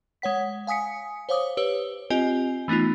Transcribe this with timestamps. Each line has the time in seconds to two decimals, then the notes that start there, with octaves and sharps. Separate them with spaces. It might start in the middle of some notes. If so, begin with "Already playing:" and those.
0.22 G#3 C#5 F#5 B6
0.67 F5 G#5 D#6 B6 C#7
1.29 C5 C#5 F5 D6 D#6
1.57 G4 B4 C#5 E6
2.10 C4 F4 G4 D#5 G#5
2.68 E3 A3 B3 D#4 F4